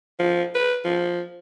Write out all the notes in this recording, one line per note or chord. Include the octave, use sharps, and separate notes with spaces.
F3
B4
F3